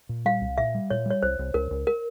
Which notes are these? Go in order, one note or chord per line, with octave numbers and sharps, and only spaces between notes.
A#2
G3 F5
C2
A#2 E5
G3
A#2 C#5
G3 C#5
C2 C5
C2
C#2 A#4
C#2
A#4